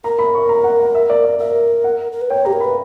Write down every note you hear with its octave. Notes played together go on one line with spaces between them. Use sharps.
A#4 A#5
B5
C#6
A#5
F#5
F#5
E5
D5
D5
A#4 E5
F#5
A#4
B4
C#5 G5
G4 A#5
A#4
B4 B5